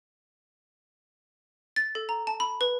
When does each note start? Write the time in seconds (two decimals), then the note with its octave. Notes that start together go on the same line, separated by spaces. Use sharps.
1.76 A6
1.95 A4
2.09 A#5
2.27 A5
2.40 B5
2.61 B4